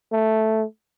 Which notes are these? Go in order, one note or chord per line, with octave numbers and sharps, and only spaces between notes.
A3